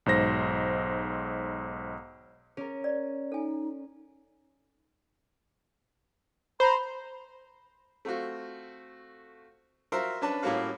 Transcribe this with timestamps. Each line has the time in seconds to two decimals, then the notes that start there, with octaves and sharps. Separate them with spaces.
0.06 B1 G#2 C5 A#6
2.57 C#4 G#4 A#4
2.84 D5
3.32 D#4 A4 G#5
6.60 C5 A#5 B5
8.05 A3 C4 F4 F#4
9.92 F4 F#4 A#4 C5 E5
10.22 C#4 D4 B4 A5
10.42 A2 G3 A#3 C#4 F#4 F5